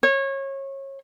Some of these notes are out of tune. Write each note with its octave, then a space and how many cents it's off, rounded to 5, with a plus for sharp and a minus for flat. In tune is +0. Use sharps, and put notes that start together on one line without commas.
C#5 -25